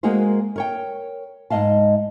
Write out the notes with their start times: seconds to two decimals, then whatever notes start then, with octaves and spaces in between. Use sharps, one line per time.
0.03 G#3 A#3 F#4 G#4 A#4 C5
0.56 A#4 C#5 G5
1.50 G#2 G#3 D#5 F5 A5